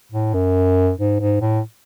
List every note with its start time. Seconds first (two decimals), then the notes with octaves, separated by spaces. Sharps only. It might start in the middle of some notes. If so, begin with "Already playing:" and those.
0.12 A2
0.34 F#2
0.98 G#2
1.20 G#2
1.41 A2